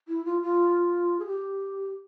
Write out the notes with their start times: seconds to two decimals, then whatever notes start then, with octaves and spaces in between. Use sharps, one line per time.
0.08 E4
0.25 F4
0.42 F4
1.20 G#4
1.26 G4